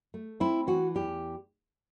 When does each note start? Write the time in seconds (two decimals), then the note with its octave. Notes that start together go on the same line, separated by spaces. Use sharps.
0.14 A3
0.40 C4 E4
0.67 E3 F#4
0.95 E2 G4